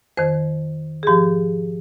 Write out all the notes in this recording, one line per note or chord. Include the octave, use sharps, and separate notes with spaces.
F2 D#3 C5
G#4
G#2 F3 G4